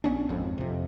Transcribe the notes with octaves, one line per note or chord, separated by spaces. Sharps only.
A#1 B3 C#4 D4
G#1 F2
F2 C3